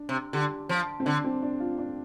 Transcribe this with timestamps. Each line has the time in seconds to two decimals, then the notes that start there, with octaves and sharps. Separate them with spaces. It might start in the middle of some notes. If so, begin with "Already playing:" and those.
Already playing: D4
0.09 C3
0.33 D3 G4
0.69 F3
1.00 C4
1.05 D3 D4
1.24 C4
1.42 D4
1.60 F4
1.78 D4